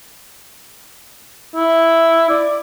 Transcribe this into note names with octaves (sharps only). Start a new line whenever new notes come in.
E4
D5